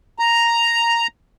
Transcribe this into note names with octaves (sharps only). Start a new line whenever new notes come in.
A#5